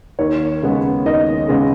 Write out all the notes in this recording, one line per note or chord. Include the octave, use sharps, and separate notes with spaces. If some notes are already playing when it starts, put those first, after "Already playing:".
D#2 C#5
C#3 G#3 B3
D#2 D#5
C#3 G#3 B3